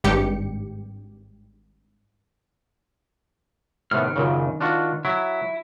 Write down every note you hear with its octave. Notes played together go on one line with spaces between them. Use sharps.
G#1 G2 G4 C#7
A2 C3 D#3 B3 F6
F#2 A#2 C#3
D4 F4 F#4
F#3 E4